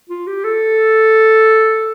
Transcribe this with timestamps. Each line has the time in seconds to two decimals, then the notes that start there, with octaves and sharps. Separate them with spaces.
0.09 F4
0.27 G4
0.44 A4